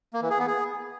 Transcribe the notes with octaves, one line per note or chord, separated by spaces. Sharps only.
A#3
E3
G#4
B3
G#4